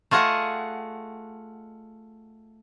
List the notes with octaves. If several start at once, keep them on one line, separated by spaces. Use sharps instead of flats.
A3 F4 G#4 D#5 F#5